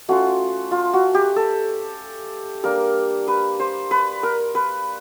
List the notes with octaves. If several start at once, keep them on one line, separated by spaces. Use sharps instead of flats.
A3 C#4 F4 F#4
F4
F#4
G4
A4
G3 A#3 D4 A#4
B4
C5
B4
A#4
B4